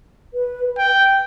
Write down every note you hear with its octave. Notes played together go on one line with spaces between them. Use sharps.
B4
G5